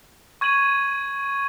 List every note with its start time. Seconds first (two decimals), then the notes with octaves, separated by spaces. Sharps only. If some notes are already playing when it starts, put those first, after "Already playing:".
0.41 C#6 G#6 D#7 F#7